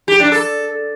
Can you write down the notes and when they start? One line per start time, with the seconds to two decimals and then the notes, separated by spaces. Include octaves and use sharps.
0.08 G4
0.20 D4
0.32 A4